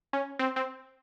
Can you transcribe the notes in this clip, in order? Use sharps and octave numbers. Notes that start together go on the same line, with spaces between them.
C#4
C4
C4